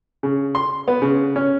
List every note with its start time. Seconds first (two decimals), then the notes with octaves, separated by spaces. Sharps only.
0.23 C#3
0.55 C6
0.88 B3
1.02 C#3
1.36 C#4